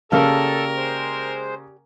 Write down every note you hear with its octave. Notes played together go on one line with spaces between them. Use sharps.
C#3 A#3 G4 A4 A#4 D5 F5 A5
G#3 C5